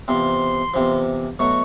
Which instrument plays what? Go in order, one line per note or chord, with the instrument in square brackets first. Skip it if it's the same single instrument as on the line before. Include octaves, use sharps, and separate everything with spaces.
[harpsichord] E2 C3 F3 [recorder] C6
[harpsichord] E2 C3 F3
[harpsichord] B2 F#3 A3 [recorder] C#6